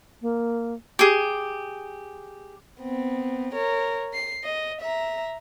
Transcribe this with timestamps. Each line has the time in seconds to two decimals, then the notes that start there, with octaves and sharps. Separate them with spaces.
0.22 A#3
0.99 G4 G#4
2.80 B3 C4
3.54 A#4 C#5
4.13 C7
4.44 D#5
4.81 E5 A#5